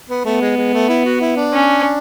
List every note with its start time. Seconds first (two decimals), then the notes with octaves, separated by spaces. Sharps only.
0.10 B3
0.25 A3 B3
0.41 G#3
0.57 G#3
0.73 A3
0.89 E4
1.05 F#4
1.21 E4
1.37 D4
1.53 C#4